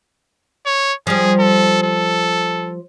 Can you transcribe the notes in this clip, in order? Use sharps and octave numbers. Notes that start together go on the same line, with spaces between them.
C#5
F3 G3 G#4
A4
A4